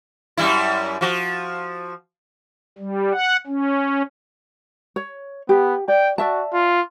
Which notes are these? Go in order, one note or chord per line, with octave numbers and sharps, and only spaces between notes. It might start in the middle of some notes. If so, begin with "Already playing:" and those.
F#2 G3 E4
F3 F#4
G3
F#5
C#4
C#5
B3 G4
D5 G5
F#4 D5 E5 A5
F4